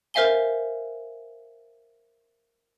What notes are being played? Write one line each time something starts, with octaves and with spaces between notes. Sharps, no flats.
A#4 C5 E5 F5 G#5 G7